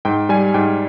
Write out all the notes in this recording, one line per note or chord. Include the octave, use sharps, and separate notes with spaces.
G#2 G5
G3 G#5
G#2 G5